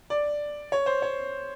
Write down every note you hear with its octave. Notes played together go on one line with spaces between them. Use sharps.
D5
C#5
C5
C#5